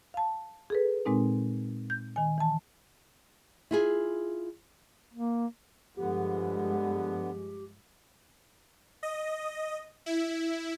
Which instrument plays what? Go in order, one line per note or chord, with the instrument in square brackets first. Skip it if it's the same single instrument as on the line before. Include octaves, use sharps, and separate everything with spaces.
[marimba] F5 A5
G#4 A4 B4
A#2 G#3 C4 D#4
G6
D#3 G#5
E3 A5
[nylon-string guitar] E4 F4 G#4
[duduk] A#3
[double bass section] G2 F3 G#3 [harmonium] D3 B3 [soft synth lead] G4
[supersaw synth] D#5
E4